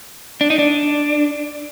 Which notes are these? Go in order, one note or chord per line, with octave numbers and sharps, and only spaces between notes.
D4
D#4
D4